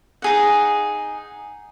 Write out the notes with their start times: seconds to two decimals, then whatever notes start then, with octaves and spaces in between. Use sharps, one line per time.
0.22 D#4 G#4 F#5